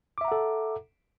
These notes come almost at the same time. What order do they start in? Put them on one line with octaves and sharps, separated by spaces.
D6 E5 A#5 F#5 A4